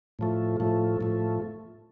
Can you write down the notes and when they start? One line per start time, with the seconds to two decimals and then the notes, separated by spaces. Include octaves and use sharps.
0.19 A2 F3 A3
0.60 A2 F3 A3
1.01 A2 F3 A3